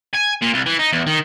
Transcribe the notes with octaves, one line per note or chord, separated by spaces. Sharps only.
G#5
A#2
C2
E3
D#4
E2
D#3